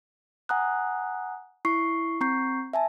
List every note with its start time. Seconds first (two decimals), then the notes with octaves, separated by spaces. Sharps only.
0.49 F#5 G#5 A#5 D#6 F#6
1.65 E4 C#6 C7
2.21 C4 A#5 C#6 G6 C7
2.73 E5 G#5 A5